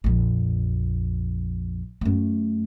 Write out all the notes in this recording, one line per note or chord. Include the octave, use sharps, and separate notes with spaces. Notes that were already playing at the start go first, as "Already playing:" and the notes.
A#1 F2
F#2 A3